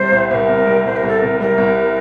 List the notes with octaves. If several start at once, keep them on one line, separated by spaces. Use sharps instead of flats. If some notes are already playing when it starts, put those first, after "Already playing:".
Already playing: C3 G3 C5
C2
C2 A#4 C5
C3
G3
C2 C5
A#4
C2 A4
C3 A#4
G3 A#4
C2